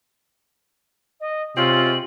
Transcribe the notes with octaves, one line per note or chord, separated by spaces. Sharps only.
D#5
C3 G#3 C4 C#4 F4 F#7